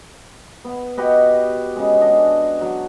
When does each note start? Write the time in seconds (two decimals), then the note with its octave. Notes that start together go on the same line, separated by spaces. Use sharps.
0.65 B3
0.97 F#4 G4 B4 D#5
1.76 C#3 G#3
2.00 D4 F#4 D#5
2.61 F#3